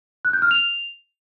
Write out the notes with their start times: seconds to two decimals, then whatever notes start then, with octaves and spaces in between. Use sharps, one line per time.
0.25 F#6
0.33 G6
0.42 F6
0.51 F7